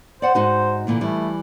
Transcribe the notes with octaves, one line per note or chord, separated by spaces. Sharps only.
C5 D5 F#5
G#2 D#4 F#4 C5
D2 A#2 E3
E3 G3 A3